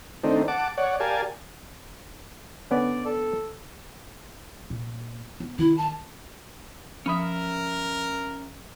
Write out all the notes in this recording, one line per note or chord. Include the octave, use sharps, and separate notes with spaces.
D#3 A3 C4 D4 D#4
F#5 A5 D6
C#5 D5 F#5
G4 A#4 D5 F5 G#5 A5
D3 B3 C#4 D5
A4
A#2
B3
D#3 E4
A5
F3 C#4 A#4 E5 B5 D#6